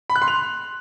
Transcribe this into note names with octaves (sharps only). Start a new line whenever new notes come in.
B5
F#6
C6
F7